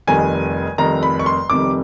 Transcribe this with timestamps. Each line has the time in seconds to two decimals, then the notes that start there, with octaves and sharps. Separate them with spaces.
0.07 F1 F2 C3 D#3 G3 G#5
0.78 F1 F2 C3 D#3 G3 A#5
1.03 B5
1.19 C#6
1.26 C6
1.50 F1 F2 C3 D#3 G3 D6